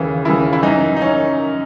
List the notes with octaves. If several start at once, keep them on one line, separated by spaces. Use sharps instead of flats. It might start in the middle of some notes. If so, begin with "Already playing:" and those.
Already playing: D#2 C#3 E3
D#2 C#3 E3 E4
E4
F#2 E3 D#4
D#4
E3 C#4